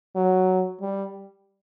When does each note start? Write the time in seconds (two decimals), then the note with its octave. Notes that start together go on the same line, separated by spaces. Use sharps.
0.15 F#3
0.82 G3